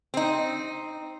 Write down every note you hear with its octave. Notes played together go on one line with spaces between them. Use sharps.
C4 D#4